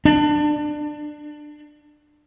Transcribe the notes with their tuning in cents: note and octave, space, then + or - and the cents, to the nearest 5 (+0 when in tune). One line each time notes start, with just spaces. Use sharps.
D4 +20